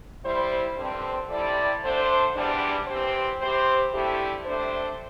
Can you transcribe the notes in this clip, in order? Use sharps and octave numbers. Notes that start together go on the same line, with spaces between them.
G3 E4 C5
G2 D3 C4
C3 G3 E4 A4 D5
D3 A3 D4 C5
E2 E3 G3 D4
E3 C4 G4 C5
E3 C4 G4 C5
G2 D3 A3 E4 G4
C3 A3 D4 C5